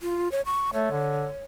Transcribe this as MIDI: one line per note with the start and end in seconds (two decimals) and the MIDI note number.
0.01 0.31 65
0.32 0.41 73
0.46 0.71 85
0.73 0.88 57
0.73 1.43 73
0.91 1.27 50